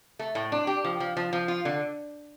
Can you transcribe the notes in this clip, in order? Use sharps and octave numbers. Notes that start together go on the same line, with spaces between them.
A3
A2
D4
G4
F3
F3
F3
F3
F4
D3